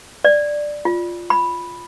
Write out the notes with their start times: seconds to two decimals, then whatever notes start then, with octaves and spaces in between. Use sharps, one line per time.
0.24 D5
0.85 F4
1.30 B5